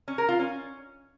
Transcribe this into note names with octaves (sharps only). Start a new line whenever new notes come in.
C#4
A#4
F4
C#4